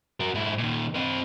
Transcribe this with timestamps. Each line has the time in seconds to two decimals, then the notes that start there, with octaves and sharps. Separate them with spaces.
0.20 F#4 A#4
0.34 G#2 E4
0.58 A#2 D#3
0.95 C4 D#5